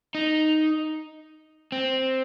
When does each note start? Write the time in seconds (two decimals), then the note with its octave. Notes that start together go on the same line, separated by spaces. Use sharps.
0.15 D#4
1.72 C4